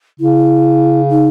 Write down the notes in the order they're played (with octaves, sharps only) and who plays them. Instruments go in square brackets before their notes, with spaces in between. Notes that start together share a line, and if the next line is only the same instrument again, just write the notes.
[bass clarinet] C#3 [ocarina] E4
[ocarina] D#4